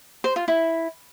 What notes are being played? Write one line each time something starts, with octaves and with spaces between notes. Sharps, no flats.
C5
F4
E4